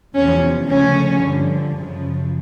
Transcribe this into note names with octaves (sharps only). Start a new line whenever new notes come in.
E2 C3 F3 C#4
D2 C#3 F3 C#4
G2 D3 F3
F#2 C#3 F3